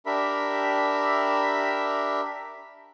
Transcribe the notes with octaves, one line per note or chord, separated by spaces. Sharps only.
D4 G4 A#4 E5 B5